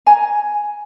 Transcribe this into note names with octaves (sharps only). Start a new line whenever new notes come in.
G#5 A#5